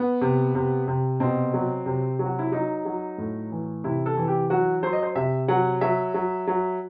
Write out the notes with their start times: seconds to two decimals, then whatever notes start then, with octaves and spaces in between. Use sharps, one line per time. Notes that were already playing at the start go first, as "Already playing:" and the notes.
Already playing: B3
0.21 C3
0.55 C3
0.88 C3
1.20 B2 C4
1.54 F#3
1.86 C3
2.19 F#3
2.26 F#4
2.39 E4
2.52 F#3 D#4
2.85 F#3
3.18 A2
3.51 E3
3.84 C3 E4
4.06 A4
4.17 E3
4.28 G4
4.50 F#3 F#4
4.83 F#3 C5
4.93 D#5
5.03 C5
5.15 C3 E5
5.48 F#3 F#5
5.81 F#3 E5
6.14 F#3
6.47 F#3